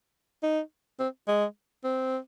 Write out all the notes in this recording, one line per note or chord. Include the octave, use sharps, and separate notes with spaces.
D#4
C4
G#3
C4